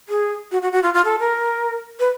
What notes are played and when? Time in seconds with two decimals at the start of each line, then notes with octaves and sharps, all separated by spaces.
0.09 G#4
0.51 F#4
0.62 F#4
0.72 F#4
0.83 F4
0.94 F4
1.05 A4
1.20 A#4
2.00 B4